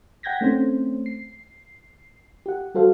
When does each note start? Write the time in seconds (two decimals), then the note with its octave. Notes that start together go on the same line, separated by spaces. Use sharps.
0.23 F#5 G5 G6 G#6 A#6 B6
0.41 A3 C4 C#4 C5
1.06 C7
2.46 G4 F#5
2.75 G3 F#4 A4 C5 F5